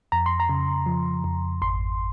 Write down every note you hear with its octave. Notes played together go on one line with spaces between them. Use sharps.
F2 A#5
C6
A#5
C#3
F3
F2
G#1 C6